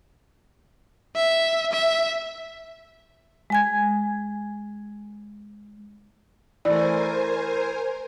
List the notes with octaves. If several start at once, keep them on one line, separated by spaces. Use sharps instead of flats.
E5
E5
G#3 G#5 G#6
E3 A3 A#4 C5 D5 G#5